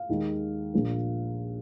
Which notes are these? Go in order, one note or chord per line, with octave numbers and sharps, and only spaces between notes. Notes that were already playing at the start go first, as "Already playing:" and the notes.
Already playing: F5
D#2 D#3 G#3
A#1 A#2 A#3